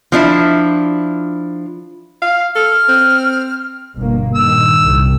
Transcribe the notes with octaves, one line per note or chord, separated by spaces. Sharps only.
F3 D4 E4
F5
A4 F6
C4
G1 B2 A#3
G2 A#2 D#3 E6
C2